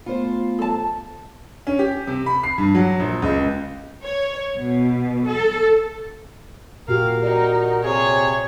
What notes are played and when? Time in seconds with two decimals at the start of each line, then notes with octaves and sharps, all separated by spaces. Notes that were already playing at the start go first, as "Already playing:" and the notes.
0.06 A3 B3 F4 C5
0.59 A4 A5
1.67 C#4
1.79 G4
2.07 C3
2.26 B5
2.43 C7
2.58 G2
2.75 F#3
3.00 A#1
3.22 C#2
4.05 C#5
4.58 B2
5.27 A4
6.88 A#2 F#4 G4 A#4 F5
7.23 D#4 F#4 D5
7.84 C3 G#4 C#5